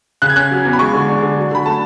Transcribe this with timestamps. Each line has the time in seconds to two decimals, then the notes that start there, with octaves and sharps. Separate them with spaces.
0.22 C#3 F#6
0.30 G#6
0.36 C#4 F#6
0.51 F#3
0.65 E2
0.73 B5
0.79 G#3 C#6
0.93 D3
1.08 D4
1.22 D3
1.37 F#3
1.51 D3 B5
1.65 A3 A5